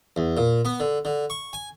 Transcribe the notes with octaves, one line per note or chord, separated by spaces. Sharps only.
E2
A#2
B3
D3
D3
C#6
G#5